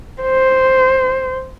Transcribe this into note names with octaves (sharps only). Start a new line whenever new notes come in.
C5